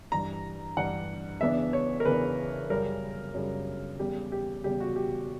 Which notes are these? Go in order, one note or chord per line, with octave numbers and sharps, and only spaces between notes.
G2 E3 G3 A#5
G2 E3 G3 F#5
E2 C#3 E3 B3 D4 E5
C#5
A#4
E2 C#3 E3 B3 D4 B4
F#2 C#3 G3 A#4
F#2 C#3 G3
E2 C#3 G3 G4
G4
E2 C#3 G3 G4
F#4
G4